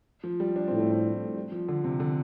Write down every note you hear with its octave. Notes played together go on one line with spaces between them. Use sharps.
F3
G3
D4
A2 C4
A3
C4
G3
F3
D3
C3
D3